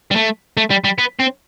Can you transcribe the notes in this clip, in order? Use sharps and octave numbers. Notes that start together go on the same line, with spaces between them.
G3
A3
A3
G3
G3
B3
C4